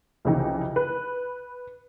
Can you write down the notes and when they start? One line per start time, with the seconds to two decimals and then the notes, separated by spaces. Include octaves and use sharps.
0.25 C2 F2 C#3 E3 D#4 G5
0.76 B4